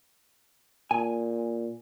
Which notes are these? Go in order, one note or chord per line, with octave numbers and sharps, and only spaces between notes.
A#2 G#5